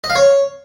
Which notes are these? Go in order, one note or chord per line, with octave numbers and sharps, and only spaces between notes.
D#5
F5
C#5